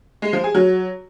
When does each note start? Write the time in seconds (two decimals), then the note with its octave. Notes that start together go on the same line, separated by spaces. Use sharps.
0.22 G#3
0.33 F3
0.44 G#4
0.55 F#3